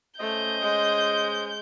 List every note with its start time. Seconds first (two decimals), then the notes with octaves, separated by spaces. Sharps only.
0.20 A3 C#4 C5 D#5 G6
0.61 G#3